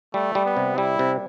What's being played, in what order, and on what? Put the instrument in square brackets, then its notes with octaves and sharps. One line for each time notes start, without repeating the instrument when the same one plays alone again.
[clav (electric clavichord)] G3 [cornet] A3
[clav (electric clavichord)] G3
[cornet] B3
[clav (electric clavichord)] C3
[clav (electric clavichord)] G3 [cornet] E4
[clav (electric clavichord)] C3